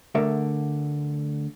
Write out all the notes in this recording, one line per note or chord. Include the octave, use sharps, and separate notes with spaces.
D2 D3 A3 A#4 D5 E5